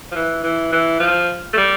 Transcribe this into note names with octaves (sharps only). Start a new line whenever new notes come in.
F3
E3
E3
E3
F3
A3
G3